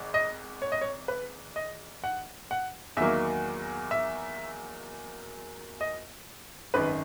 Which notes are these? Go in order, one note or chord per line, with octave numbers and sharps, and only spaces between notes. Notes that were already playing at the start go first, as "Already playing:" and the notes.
Already playing: G#1 G#2
D#5
C#5
D#5
C#5
B4
D#5
F#5
F#5
E2 D#3 F#3 A#3 E5
E5
D#5
G#1 F#2 D#3 B4